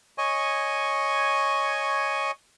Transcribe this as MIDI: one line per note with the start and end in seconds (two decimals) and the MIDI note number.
0.18 2.31 73
0.18 2.31 75
0.18 2.31 80
0.18 2.31 85